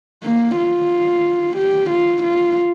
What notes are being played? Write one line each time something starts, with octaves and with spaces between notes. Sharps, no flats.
A#3
F4
G4
F4
F4